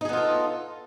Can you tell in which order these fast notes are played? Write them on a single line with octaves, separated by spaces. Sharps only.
D#4 G#4 B3 F4 A4